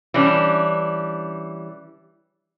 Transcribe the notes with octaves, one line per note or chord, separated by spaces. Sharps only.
E3 G3 C#4 D4